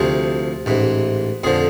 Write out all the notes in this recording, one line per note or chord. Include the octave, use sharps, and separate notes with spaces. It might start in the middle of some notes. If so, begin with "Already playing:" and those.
Already playing: D2 C3 F3 G#4
A1 G#2 E3
F2 D3 F3 G#4